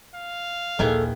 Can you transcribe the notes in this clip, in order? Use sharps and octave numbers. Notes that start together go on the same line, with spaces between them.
F5
A#1 D#2 D#3 E3 G#4 A4